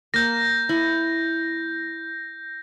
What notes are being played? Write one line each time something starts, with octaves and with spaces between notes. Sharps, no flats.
A#3 G6 A#6
E4